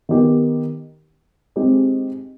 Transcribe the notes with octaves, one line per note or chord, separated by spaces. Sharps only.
D#3 B3 D#4 G4
G#3 C4 D#4 G4